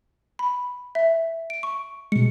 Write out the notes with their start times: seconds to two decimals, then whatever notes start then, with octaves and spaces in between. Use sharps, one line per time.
0.39 B5
0.95 E5
1.50 D7
1.63 C#6
2.12 B2 G#3 C#7